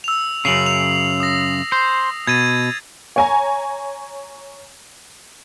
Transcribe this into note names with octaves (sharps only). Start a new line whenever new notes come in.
E6 F7
F#2 C#3 C7 F7 F#7
F7
D#6 A#6
C5
B2 G#6 A6 D#7
C#5 G#5 A#5